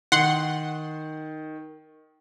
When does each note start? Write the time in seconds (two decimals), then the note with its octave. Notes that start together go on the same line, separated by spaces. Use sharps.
0.12 D#3 F#5 C6